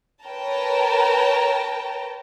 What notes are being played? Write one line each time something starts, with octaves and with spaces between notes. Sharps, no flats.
A#4 B4 C#5 G5 A5 A#5